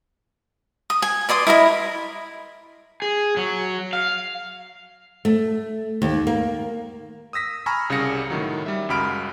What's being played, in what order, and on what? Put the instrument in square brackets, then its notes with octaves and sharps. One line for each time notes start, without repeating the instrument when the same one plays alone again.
[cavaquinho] D#6
G#5
B4 D5 C6 D#6
E4 A#4 D#5 B5
[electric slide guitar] G#4
F#3
F5
[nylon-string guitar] A3
D#2
A#3
[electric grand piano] D#6 E6 A#6 B6
G#5 A#5 B5 C#6 E6 F6
C2 C#3 G3 F5 A#6 C#7
A2 D#3 F#3
G3 E5
C#2 F#2 F#4 B5 F6 D7